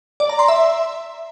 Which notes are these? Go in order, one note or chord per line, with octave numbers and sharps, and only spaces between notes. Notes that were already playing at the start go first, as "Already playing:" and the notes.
D5
A#5
C6
E5